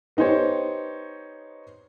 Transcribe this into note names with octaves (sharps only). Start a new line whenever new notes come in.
B3 D#4 G4 C5 C#5